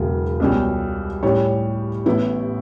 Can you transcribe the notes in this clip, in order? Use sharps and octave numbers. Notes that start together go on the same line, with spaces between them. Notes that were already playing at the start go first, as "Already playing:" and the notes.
Already playing: E1 E2 C#3 F#3
C#2 B2 G3 C#4
A2 G3 C#4 G4 C#5
A1 A2 E3 B3 E4